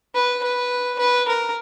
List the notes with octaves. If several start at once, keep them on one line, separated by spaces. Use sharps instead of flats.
B4
B4
B4
A#4